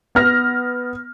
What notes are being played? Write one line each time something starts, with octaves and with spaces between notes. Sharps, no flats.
B3 F6 A#6